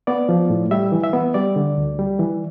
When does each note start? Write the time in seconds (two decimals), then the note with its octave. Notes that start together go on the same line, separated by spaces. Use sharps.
0.07 B3 D5
0.29 F3
0.50 A2
0.71 G3 E5
0.92 E3
1.03 E5
1.13 B3
1.34 G3 D5
1.56 D3
1.78 D2
1.99 G3
2.19 E3